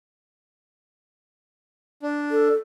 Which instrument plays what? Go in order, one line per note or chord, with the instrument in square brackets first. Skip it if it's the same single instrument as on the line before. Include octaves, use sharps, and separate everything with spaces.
[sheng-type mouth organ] D4
[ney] A4